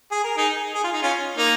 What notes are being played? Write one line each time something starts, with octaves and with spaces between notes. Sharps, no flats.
G#4
A#4
D#4 G#4
G#4
F4
D#4
C#4 F4
A#3 D#4